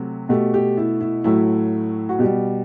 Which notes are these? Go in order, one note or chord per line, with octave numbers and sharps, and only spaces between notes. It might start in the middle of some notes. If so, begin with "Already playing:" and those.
Already playing: C3 F#3 A3
B2 A3 G4
G4
E4
E4
A2 F#3 A3 E4
F#4
B2 G3 G4